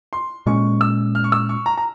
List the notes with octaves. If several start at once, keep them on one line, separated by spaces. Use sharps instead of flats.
C6
A#2 G#3 C#4 C#6
E6
F6
C#6
E6
C#6
A#5
A#5